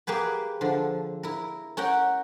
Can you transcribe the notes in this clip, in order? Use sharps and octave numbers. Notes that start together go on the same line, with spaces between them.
A#3 G4 G#4 B4
D3 F3
E4 A#4
C#4 A#4 F#5 G5